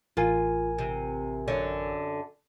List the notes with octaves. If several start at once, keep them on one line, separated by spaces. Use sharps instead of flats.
A1 F4 A#4 G#5
C3
F#2 D3 C#5